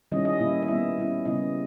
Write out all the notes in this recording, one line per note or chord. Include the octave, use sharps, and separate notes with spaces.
D#3 G3 C#4 E4 D#5
D#5
A#2 A#3 C#4 E4
D#5
G3 B3 E4 E5
G3 C#4 E4
C#3 G3 B3 E4 D#5